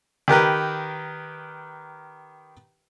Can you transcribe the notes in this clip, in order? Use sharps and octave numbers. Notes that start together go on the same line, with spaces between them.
D#3 G4 A#4 B4